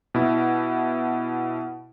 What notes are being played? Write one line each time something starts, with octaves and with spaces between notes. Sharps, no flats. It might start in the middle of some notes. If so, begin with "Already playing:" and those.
B2 E4